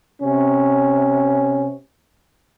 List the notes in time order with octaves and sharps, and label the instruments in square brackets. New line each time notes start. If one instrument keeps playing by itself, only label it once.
[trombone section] C3 C#4